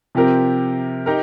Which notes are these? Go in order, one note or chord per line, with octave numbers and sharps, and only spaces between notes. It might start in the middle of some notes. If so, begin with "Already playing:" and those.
C3 F3 C4 G4 A#4
D#4 G4 A#4